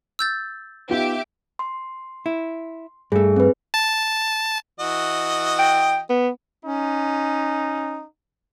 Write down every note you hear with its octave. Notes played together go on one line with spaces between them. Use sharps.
E6 G6 A6
B3 D#4 F4 G4 E5 D6
C6
E4
G2 A3 G#4
C4 B4
A5
E3 F#4 D#5
G5
B3
C#4 D#4